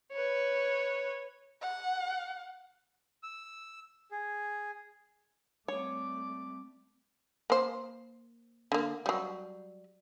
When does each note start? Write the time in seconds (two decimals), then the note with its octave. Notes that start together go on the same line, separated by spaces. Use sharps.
0.13 B4 C#5
1.62 F#5
3.23 E6
4.11 G#4
5.68 G3 A3 C4 C#5 D5 D6
7.50 A#3 C5
8.72 D3 A#3
9.06 F#3 G3